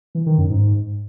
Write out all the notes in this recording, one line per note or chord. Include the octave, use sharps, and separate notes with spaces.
E3
D#3
F#2
G#2